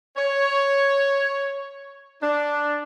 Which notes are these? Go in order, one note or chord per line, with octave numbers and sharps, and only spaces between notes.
C#5
D4